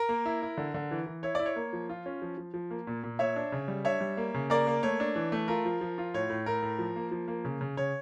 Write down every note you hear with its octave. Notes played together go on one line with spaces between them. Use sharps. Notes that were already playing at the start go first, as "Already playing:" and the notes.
Already playing: A#4
A#3
E4
E4
D3
D3
E3
E3
E4 C#5
E4 D5
C#5
A#3
F3
F4
C#4
F3
F3
F3
A#3
A#2
A#2
A#2 C#5 E5
D4
C#3
G3
D4 C#5 E5
G3
A#3
C#3
A#3 A#4 D5
A#3
A3 C#5
D4
E3
A3
F4 A#4
F3
F3
F4
A2 C#5
A2
A2 A#4
A2
F3
A#3
F3
A#3
C#3
C#3
C#3 C#5